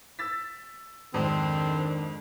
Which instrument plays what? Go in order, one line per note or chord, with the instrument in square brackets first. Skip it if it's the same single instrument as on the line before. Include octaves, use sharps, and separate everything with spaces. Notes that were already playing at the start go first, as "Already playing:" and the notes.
[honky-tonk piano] E6 A6 B6
[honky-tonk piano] F2 G#2 [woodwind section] D#3 [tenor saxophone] C4 [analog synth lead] D4